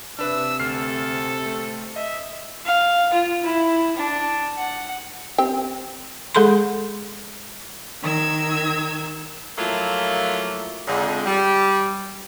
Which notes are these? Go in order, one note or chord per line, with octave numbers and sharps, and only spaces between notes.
C3 D4 B4 E5 E6
D2 A4 F6 C7
A3 C4
D#5 E5
F5
F4
E4
D4
F#5
C4 G4 G5
G#3 G#4 A4 B5 C6
D#3 E6 G#6
F3 F#3 A3 A#3 E4 F4
F2 D3 G#3
G3